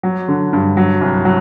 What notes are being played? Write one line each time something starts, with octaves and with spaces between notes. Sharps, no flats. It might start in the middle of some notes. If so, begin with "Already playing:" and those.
F#3
D3
G2
F#3
C2
F#3